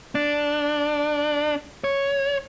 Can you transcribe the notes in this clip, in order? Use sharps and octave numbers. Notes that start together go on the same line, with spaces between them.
D4
C#5